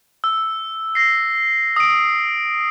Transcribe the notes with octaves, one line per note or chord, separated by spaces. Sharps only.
E6
A#6 C7
D#6 D7